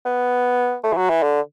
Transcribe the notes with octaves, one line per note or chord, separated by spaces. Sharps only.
B3
A3
E3
F#3
E3
D3